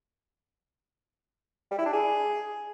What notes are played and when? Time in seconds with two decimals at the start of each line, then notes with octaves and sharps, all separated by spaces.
1.71 G3
1.79 E4
1.86 D4
1.93 G#4